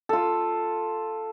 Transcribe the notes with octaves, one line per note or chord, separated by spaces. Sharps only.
F4 A4